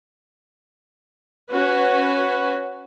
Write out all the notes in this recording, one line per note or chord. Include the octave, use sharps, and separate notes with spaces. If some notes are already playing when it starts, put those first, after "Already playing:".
C#4 F#4 B4